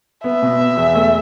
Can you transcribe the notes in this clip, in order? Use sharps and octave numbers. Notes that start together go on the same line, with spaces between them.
B3 E5
B2
B3
E2
A3